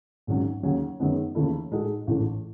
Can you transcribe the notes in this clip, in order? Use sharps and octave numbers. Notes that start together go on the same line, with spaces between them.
G#1 G#2 F#3 C#4
D#2 C#3 F#3 C#4 G#4
F#2 D#3 G#3 B3 D#4
D#2 C#3 E3 A3 E4
A2 G#3 D#4 F#4 A4
A1 G#2 E3 A3 C#4